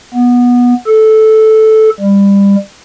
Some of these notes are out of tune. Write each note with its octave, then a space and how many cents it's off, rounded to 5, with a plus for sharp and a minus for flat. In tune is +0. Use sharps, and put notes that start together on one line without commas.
B3 -15
A4 -10
G3 +25